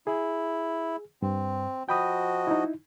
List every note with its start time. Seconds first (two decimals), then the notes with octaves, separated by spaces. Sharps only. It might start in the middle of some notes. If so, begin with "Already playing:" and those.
0.07 E4 G#4
1.22 G2 C4
1.89 F3 F#4 D#5 G5 B5 D#6
2.47 D#4 E4